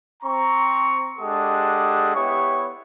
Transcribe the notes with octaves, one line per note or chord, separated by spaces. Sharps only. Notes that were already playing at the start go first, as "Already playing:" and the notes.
C4 A#5 C#6
G#3 D4 G4 A4 F#5 D#6
B3 E4 G4 C#5 C#6